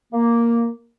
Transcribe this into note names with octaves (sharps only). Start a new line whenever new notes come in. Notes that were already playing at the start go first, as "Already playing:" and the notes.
A#3